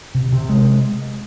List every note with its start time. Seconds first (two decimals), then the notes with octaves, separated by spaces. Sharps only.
0.15 C3
0.32 C3
0.49 G#3